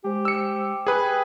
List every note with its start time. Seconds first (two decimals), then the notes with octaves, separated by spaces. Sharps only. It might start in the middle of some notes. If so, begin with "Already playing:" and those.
0.04 G#3 G4 C5
0.25 E6 C#7
0.87 G#4 B4 G5